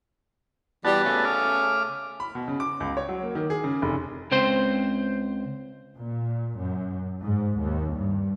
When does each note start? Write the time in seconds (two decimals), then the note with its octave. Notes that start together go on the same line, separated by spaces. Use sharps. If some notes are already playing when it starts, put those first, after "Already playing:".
0.85 E3 G3 B3 F#4 A5
1.04 C#3 A3 C#4
1.25 D6 F6
2.20 B5
2.35 B2
2.48 C#3
2.60 D6
2.80 C#2
2.97 C#5
3.09 F#3
3.23 A#3
3.35 D#3
3.50 G#4
3.64 C#3
3.82 F1
4.32 C#2 C4 C5 C6
5.97 A#2
6.58 F#2
7.22 G#2
7.59 D#2
7.95 G2